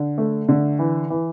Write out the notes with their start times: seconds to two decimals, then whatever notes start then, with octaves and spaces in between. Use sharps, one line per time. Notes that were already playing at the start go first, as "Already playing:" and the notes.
Already playing: D3
0.18 A3
0.48 D3
0.79 E3
1.10 E3